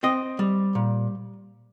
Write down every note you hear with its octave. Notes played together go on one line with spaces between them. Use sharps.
C4 D#5
G3
A#2